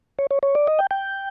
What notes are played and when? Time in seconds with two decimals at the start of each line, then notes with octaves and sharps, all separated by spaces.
0.19 C#5
0.31 C#5
0.43 C#5
0.55 D5
0.67 D#5
0.79 G5
0.91 G5